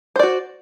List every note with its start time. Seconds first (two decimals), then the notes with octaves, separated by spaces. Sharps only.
0.16 C5
0.19 D5
0.23 F#4